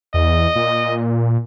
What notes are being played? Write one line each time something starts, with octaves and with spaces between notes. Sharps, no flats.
E2 D#5
A#2